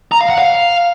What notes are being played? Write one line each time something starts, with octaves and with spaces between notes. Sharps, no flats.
A#5
F5
F#5
F5